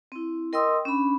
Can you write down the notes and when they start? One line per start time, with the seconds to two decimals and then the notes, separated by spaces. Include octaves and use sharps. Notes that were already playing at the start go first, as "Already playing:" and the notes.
0.12 C4 E4
0.53 A#4 D#5 G5 C6 D#6 E6
0.85 C#4 D4 B5